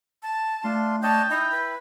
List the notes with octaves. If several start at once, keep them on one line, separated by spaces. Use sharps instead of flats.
A5
A3 D4 F4 C6
D4 C#5 D#5 G5 A5
D#4 E4 E6
B4